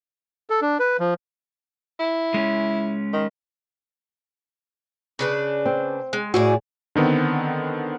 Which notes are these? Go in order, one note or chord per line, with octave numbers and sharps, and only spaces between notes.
A4
D4
B4
F3
E4
G#3 C#4
D#3
C#3 D4 B4
C4
G#3
A2 E4 F#4 G#4 D5
D3 D#3 B3 C4